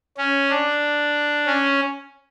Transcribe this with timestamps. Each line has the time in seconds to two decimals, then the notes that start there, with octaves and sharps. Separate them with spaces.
0.17 C#4
0.50 D4
1.46 C#4